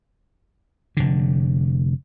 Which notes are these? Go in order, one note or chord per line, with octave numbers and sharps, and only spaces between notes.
F1 D3